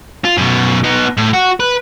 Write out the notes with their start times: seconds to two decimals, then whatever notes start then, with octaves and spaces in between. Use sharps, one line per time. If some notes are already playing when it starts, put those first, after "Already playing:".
0.25 F4
0.37 F#2 B2
0.84 B3 D#4
1.17 A2
1.33 F#4
1.60 B4